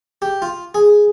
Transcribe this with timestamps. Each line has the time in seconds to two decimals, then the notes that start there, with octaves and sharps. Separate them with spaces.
0.22 G4
0.42 F4
0.74 G#4